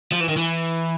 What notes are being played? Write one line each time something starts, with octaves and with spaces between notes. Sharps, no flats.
F3
E3
D#3
E3